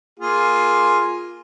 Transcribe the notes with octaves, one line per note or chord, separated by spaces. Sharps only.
A#3 F4 G#4